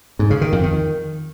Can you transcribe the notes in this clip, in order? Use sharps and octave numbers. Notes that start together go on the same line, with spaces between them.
G#2
C#3
D#3
F2
D#3